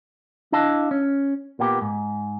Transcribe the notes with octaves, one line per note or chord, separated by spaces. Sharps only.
D4 E4 D#5 F5 A5
C#4
A#2 A#3 B3 G4
G#2